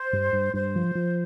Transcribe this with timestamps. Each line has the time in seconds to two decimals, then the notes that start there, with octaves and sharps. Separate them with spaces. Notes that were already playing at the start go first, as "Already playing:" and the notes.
Already playing: C5
0.13 G2
0.33 G2
0.54 G2 C5
0.75 F3
0.95 F3